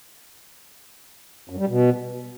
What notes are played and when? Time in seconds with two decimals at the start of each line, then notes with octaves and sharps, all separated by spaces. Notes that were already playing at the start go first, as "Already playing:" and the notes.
1.50 F#2
1.59 G3
1.68 B2